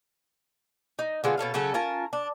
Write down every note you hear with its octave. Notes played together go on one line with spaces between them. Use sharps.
D#4
D3 G#3 B3 F4
B2 C#4 A4 F5
C#3 F#3 C#4 A4
C#4 F4 A#4 A5
D4